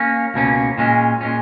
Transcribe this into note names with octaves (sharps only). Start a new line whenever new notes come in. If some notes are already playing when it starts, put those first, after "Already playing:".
Already playing: A#3 C#4
C#2 B2 A#3 C#4
A#2 G#3 C#4
A#2 G#3 C#4